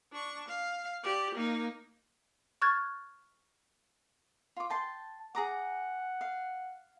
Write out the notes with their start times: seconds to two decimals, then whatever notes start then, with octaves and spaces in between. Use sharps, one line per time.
0.12 D4 C#6
0.48 F5
1.04 G4 D5
1.35 A#3 D#4
2.62 C#6 F6 F#6 G#6 A6
4.56 F4 D6
4.70 G5 A5 C6
5.35 G#4 F#5 A#5 D6
6.21 F5